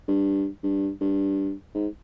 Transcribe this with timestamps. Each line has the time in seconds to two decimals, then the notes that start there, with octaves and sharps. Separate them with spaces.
0.08 G2
0.63 G2
1.01 G2
1.75 G#2